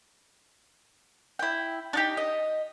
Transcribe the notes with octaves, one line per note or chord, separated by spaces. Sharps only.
E4 G5
D4 D#4 G4
D#5